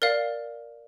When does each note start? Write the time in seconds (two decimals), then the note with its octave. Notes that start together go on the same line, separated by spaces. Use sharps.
0.02 A#4 D5 F5